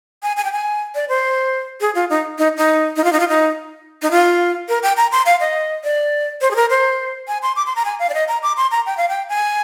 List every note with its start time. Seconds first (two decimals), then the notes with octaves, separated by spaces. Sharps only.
0.23 G#5
0.37 G#5
0.45 G5
0.52 G#5
0.95 D5
1.09 C5
1.81 G#4
1.95 F4
2.10 D#4
2.38 D#4
2.57 D#4
2.96 D#4
3.04 F4
3.12 D#4
3.20 F4
3.28 D#4
4.02 D#4
4.11 F4
4.69 A#4
4.83 G5
4.97 A#5
5.12 C6
5.26 F5
5.40 D#5
5.84 D5
6.41 C5
6.51 G#4
6.56 A#4
6.70 C5
7.28 G#5
7.42 C6
7.56 D6
7.66 C6
7.76 A#5
7.85 G#5
7.99 F5
8.09 D5
8.14 D#5
8.28 A#5
8.43 D6
8.57 C6
8.71 A#5
8.86 G5
8.97 F5
9.09 G5
9.29 G#5